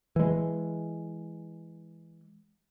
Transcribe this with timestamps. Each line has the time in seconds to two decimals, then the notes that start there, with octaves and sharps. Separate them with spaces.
0.16 E3 G#3